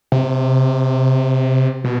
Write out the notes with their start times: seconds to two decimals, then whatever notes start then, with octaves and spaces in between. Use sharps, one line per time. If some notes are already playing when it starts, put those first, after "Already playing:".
0.12 C3
1.84 B2